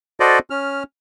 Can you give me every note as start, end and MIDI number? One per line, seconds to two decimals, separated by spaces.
0.20 0.39 66
0.20 0.39 69
0.20 0.39 72
0.20 0.39 74
0.20 0.39 75
0.50 0.83 61
0.50 0.83 89